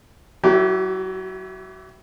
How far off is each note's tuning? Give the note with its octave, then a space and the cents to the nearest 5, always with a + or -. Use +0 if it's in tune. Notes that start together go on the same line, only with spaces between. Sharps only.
F#3 +25 E4 +0 G4 -25